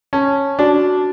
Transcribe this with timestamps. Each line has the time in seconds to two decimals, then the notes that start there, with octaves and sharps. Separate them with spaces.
0.13 C#4 A5
0.59 D4 F#4